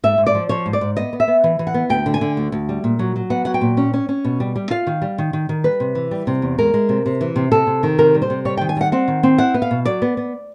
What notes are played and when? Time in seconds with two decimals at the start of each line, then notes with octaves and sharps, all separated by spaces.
0.04 G#2 E5
0.18 G#2
0.27 D5
0.35 F3
0.49 F3 C#5
0.66 G#2
0.73 D5
0.81 G#2
0.97 B3 D#5
1.13 B3
1.20 E5
1.28 B3
1.44 E3
1.59 E3
1.67 F#5
1.74 B3
1.90 D2 G5
2.06 D3
2.14 G#5
2.21 D3
2.37 D2
2.52 D2
2.69 G3
2.84 A#2
2.99 F#3
3.16 F#3
3.30 B3 F#5
3.45 F#3 F#5
3.54 G5
3.61 A#2
3.77 C#4
3.94 C#4
4.09 C#4
4.25 B2
4.40 G3
4.56 G3
4.70 F4 F5
4.87 D#3
5.02 G3
5.18 D#3
5.33 D#3
5.49 D#3
5.64 G3 B4
5.80 C3
5.95 E3
6.11 G3
6.27 C3
6.42 E2
6.58 G#3 A#4
6.74 G#3
6.89 C3
7.06 C3
7.21 E3
7.36 C3
7.52 C3 A4
7.67 C3
7.83 D#3
7.98 C3 A#4
8.14 G3
8.22 C5
8.30 C3
8.45 G3 C#5
8.57 G5
8.61 D#3
8.69 G#5
8.77 G3 F#5
8.92 C4 F#5
9.08 D#3
9.23 C4
9.38 E4 F#5
9.54 B3
9.62 F5
9.71 B2
9.85 F#3 D5
10.02 B3
10.17 B3